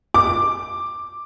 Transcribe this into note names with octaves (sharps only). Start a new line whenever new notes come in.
D6